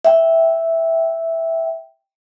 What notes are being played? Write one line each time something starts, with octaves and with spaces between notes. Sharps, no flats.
E5 G5